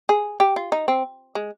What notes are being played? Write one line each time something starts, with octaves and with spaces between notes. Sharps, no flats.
G#4
G4
F4
D#4
C4
G#3